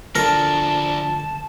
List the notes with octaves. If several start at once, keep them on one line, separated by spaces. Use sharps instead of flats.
D2 F3 D4 A4 A#4 A5